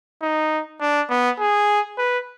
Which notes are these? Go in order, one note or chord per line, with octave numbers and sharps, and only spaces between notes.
D#4
D4
B3
G#4
B4